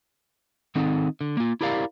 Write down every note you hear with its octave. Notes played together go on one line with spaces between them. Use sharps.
D#3 C4 D#4 A4
D3
A#3 F4
E4 G4 A#4 D5 F5